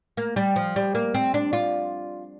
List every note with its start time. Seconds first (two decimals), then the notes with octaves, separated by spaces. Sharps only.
0.17 A#3
0.36 G3
0.56 F3
0.76 G3
0.95 A#3
1.14 C4
1.34 D4
1.53 F4